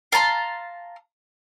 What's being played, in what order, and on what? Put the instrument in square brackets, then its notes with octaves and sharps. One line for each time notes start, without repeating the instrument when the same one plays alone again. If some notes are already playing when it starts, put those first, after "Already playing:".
[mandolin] F5 A5 A#5 C6